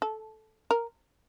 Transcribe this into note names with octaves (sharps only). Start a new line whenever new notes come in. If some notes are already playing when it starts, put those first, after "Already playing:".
A4
A#4